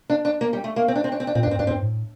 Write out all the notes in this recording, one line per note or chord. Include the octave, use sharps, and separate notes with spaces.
D4
D4
A#3
G3
A3
A#3
C4
D4
C4
D4
C4
D4
A#2 C4
D4
G2
C4
G2 D4
C4
G2
A2